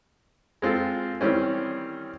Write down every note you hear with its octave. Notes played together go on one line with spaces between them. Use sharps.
G#3 C4 F4 A4
D#3 E3 G3 C4 C#4